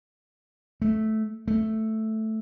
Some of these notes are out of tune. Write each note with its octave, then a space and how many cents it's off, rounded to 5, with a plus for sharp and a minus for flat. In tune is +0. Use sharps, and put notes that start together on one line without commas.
A3 -10
A3 +0